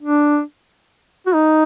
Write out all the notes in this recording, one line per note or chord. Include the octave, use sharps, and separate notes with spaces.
D4
F#4
D#4